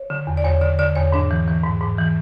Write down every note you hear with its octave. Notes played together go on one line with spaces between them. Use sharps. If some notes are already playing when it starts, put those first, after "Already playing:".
Already playing: C#5
D3
E2
D5
E2 C#5
D3 D5
D3 D5
E2 C#5
G#2 D4
E3
E3
G#2
G#2
E3